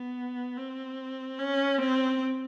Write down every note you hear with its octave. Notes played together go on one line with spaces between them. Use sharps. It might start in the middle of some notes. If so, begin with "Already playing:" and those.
Already playing: B3
C4
C#4
C4